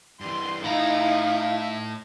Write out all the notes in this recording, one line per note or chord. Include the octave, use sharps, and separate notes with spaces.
G2 E3 C6
A2 D#4 E4 E5 F5 A#5 B5